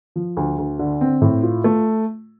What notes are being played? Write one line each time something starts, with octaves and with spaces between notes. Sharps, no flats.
F3
D2
D2
D3
C4
A2
F4
A3